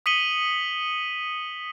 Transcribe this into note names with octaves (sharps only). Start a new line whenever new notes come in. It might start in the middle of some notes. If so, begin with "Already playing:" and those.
D#6 B6 C#7 D#7 F#7 G7